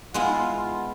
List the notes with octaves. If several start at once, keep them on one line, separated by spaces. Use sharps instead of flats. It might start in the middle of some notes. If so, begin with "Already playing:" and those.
G#3 B3 E4 F4